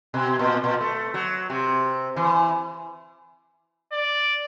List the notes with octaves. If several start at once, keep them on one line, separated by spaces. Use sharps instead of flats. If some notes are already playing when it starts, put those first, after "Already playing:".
B2
A#2
A#2
A3
F#3
C3
E3
D5